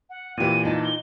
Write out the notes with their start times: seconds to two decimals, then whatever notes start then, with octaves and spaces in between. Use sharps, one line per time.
0.10 F#5
0.37 A#2 E3 C4 G4 D#7
0.65 D#4 F4 A5
0.85 G7